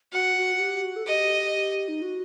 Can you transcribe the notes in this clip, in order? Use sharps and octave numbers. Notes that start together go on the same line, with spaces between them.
F#4 F#5
F#4
F#4
G4
F#4
A4
G4 D#5
D#4
F#4